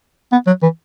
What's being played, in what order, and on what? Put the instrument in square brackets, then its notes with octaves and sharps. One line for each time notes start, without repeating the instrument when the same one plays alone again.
[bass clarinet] B3
F#3
E3